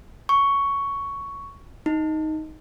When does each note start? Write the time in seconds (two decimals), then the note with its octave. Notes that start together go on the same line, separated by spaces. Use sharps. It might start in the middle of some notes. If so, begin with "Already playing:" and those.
0.29 C#6
1.86 D#4